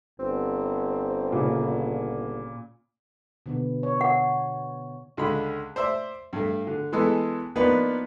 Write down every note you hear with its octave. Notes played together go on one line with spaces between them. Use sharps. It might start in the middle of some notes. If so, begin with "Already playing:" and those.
G1 C4
A#2 C#3
B2 D3 B3
C#5
F#5
C#2 D3 G#3 B5
C5 D5 E5
G2 A3
D3
E3 G#3 B3 A4 D#5
F3 A#3 B3 D4 D#4 B4